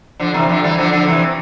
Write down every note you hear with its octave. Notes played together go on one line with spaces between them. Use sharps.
D3 F3
C3 E3
D3 F3
E3 G3
D3 F3
D3 F3
C3 E3